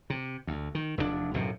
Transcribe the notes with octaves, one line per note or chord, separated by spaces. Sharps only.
C3
D2
D#3
F1 E2 G2 D4
B1 F#2 A2 C3